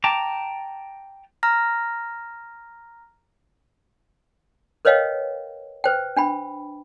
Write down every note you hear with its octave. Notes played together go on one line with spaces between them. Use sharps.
G5 A5 A#5 D6
A#5 F6 A#6
A#4 B4 C#5 D#5 F5 G5
B4 C5 G5
D4 G5 B5